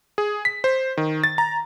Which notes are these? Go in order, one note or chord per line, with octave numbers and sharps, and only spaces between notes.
G#4
B6
C5
D#3
A6
A#5